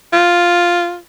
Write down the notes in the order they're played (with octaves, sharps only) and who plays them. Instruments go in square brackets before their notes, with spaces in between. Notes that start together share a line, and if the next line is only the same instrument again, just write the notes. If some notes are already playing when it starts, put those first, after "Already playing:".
[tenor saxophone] F4